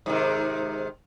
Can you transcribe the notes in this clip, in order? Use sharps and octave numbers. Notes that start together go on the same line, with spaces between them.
G#2 C3 D#3